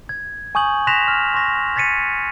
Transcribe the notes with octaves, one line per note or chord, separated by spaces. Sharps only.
G#6
G#5 C#6 D#6 G6 F#7
C6 F#6 A#6 B6 E7 F7
F6
C6 C#6 A#6
G#6 A6 B6 C#7 D#7